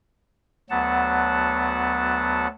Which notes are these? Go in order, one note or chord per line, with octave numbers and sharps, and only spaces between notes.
D2 F#3 B3 F#5 A5